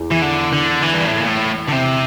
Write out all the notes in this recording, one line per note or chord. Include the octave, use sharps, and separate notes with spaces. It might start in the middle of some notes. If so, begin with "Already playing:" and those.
Already playing: E2
E3
D3
D3
E3
G2
A2
A#2
A2
D3
C3